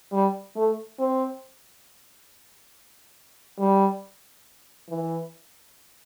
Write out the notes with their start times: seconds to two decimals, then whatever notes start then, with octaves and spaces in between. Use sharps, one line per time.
0.12 G3
0.56 A3
0.99 C4
3.59 G3
4.89 E3